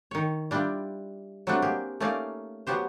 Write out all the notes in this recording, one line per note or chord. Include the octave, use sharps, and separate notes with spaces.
D#3 C#5
G3 D4 E4 F4 G5
F#3 G3 A3 C4 D4 F#4
A#3 G4 G#4
A3 A#3 C#4 D#4 D5 F5
F#3 B3 F#4 G4 C5